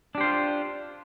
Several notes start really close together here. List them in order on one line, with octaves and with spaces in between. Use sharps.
D4 G4 C5 F4